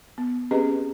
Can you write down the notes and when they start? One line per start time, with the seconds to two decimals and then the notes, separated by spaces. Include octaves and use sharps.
0.18 B3
0.51 C4 C#4 G4 G#4 B4 D#5